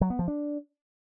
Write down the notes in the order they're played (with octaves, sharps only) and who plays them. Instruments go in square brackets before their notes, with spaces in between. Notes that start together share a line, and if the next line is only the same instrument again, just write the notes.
[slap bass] F#3
B3
F3
D4